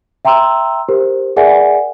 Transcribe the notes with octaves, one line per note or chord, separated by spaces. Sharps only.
E5 G5 A#5 C6 E6
G4 A#4 C5
G#4 A#4 D5 E5 F#5 G#5